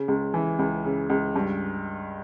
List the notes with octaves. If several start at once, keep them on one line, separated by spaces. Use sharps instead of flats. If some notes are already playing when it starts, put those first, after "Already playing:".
Already playing: C#3
C#2
E3
C#2
C#3
C#2
G2